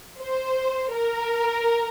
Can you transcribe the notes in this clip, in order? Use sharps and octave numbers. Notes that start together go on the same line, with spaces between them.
C5
A#4